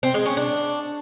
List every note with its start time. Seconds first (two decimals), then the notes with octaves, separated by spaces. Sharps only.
0.03 C4
0.14 G#3
0.26 C#4
0.37 D4